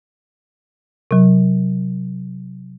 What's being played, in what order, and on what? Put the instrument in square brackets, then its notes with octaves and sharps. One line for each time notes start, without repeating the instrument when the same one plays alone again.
[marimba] C3 F#3